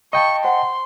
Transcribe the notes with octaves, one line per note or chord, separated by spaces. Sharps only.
D#5 F5 G5 A5 B5 C#6
C5 F#5 G#5 C6